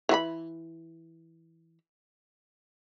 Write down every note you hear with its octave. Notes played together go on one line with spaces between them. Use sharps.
E3 F#4 B5